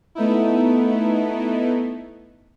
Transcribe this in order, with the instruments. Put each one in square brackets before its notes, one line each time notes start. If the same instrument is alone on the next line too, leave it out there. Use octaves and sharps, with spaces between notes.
[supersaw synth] A3 B3 D#4 E4